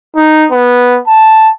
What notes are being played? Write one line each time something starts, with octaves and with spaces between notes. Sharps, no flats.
D#4
B3
A5